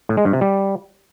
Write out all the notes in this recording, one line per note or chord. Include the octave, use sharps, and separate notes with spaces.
A2
G#3
G2
C3
G3